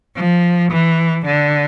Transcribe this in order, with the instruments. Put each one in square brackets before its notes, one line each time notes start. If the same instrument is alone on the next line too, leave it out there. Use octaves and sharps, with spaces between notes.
[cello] F3
E3
D3